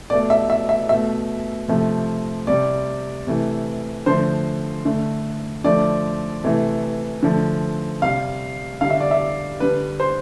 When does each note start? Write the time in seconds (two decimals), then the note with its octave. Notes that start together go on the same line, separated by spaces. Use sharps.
0.10 B2 A3 D5
0.30 E5
0.50 E5
0.69 E5
0.89 B2 A3 E5
1.68 C3 F3 A3
2.47 C3 G3 D5
3.27 C3 E3 A3
4.06 D3 F3 A3 C5
4.85 D3 A3
5.64 D3 F3 A3 D5
6.44 C3 E3 A3
7.22 D3 F3 A3
8.02 C3 G3 F5
8.81 D3 G3 F5
8.90 E5
9.00 D5
9.11 E5
9.60 D3 G3 B4
10.00 C5